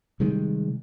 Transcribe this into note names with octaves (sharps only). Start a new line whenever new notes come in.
C3 D#3 G3 G#3